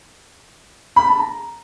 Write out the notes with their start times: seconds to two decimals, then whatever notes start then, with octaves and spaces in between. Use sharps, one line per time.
0.96 B5
1.08 A5
1.19 A#5